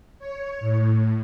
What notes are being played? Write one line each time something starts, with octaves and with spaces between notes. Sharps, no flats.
C#5
A2